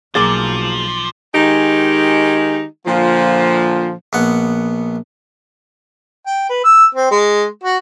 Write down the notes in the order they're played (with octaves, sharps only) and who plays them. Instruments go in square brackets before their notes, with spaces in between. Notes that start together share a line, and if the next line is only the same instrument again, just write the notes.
[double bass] B1 [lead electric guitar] F3 [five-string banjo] F#3 A#3 G#4 [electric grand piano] D6 A6
[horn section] D#3 G#3 D#4 G4 G#5
A#2 D3 F3
[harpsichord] A#1 B3 F#5
[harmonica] G5
B4
E6
C4
G#3
F#4